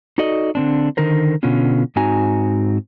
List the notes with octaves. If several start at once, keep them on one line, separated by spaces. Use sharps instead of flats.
D#4 F#4 A4 D5 D#5
D3 C4 D4
D3 D#3 D#4 A#4 C5
B2 D3 B3 C#4 F4
G#2 C4 D#4 F#4 G#5 A#5